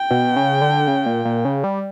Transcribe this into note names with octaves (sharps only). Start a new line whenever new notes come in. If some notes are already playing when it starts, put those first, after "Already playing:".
Already playing: G5
B2
C#3
D3
C#3
A#2
A#2
C#3
G3